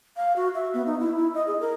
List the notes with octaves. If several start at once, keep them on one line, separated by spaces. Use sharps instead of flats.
F5
F#4
E5
B3
D#4
E4
E4
D#5
G#4
A#4